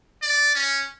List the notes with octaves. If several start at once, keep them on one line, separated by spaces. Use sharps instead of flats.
D5
C#4